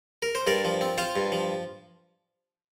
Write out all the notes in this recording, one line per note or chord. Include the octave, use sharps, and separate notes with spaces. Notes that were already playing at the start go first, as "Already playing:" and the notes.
A#4
C5
G2 A#4 D5
F3
C4
F4 C5 F5
G2
F3